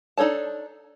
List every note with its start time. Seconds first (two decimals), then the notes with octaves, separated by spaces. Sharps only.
0.18 D4 D#4 A4 C#5 A5